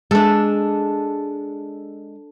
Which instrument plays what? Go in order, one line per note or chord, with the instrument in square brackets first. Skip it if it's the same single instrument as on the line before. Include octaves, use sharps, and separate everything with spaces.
[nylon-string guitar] G#3 [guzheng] D4 A4